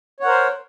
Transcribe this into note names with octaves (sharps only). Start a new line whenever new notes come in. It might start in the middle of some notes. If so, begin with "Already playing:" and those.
A#4 C5 C#5 F#5